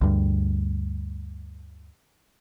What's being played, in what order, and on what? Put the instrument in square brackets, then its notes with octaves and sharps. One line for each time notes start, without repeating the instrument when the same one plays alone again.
[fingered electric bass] D2 G2